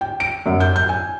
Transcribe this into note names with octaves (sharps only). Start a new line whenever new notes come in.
G5
D7
F#2
G6
G6
G#5